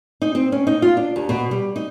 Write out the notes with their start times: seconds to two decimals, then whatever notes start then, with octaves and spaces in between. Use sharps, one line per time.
0.22 D#4
0.35 C4
0.52 C#4
0.67 D#4
0.82 F4
0.97 D4
1.16 D#2
1.29 B2
1.51 G3
1.76 D#4